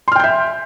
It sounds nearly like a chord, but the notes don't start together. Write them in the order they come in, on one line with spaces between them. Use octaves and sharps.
C6 F6 G5 G6 E5